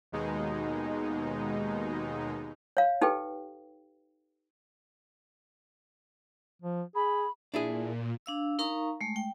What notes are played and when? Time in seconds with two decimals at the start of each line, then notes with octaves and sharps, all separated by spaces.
0.12 D#2 B2 G#3 D#4
2.77 C#5 F5
3.01 D#4 G4 A4 B4 G5
6.62 F3
6.95 G#4 B5
7.54 A#2 D4 E4 G#4
8.26 D4 F5 E6
8.59 D#4 A#4 F5 A#5 C#6
9.01 G#3 A3
9.16 G5